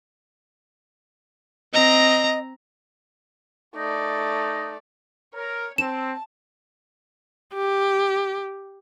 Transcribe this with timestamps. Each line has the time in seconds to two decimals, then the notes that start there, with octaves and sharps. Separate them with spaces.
1.73 C4 D#5 A#5
3.76 A3 D#4 D5
5.34 A#4 C#5
5.78 C4 A5 E7
7.54 G4